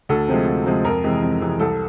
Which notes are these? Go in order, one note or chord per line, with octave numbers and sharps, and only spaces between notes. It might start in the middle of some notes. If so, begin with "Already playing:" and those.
D2 A4
C3 F3 G#3
D2
C3 F3 G#3
F2 A#4
C3 E3 G#3
F2
C3 E3 G#3
C2 A4